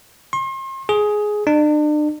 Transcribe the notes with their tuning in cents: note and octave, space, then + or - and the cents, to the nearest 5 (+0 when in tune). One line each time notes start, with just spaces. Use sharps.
C6 +40
G#4 +10
D4 +40